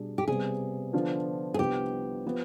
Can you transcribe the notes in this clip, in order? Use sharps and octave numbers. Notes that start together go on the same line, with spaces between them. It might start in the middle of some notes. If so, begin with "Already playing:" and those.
Already playing: B2 G3 D4 G#4
G4
C3 G3 B3 G#4
D3 F3 B3 D4 F4
G#4
C2 C3 F3 B3 D4 G4
F3 B3